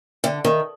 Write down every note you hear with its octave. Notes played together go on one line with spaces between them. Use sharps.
D3
D#3